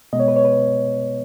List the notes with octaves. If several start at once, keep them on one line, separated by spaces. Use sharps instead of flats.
B2 G#3 B3 D#5
C#5
B4
C#5
B4